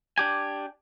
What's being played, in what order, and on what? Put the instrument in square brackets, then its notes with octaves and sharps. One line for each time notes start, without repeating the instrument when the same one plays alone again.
[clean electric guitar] D4 G4 G#5